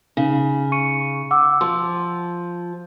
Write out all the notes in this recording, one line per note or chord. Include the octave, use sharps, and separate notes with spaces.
C#3 D#4
C#6 C#7 D#7
F#5 D6 E6
F3 C6